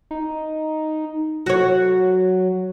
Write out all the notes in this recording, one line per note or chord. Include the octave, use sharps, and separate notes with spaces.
D#4
F#3 F#4 C#5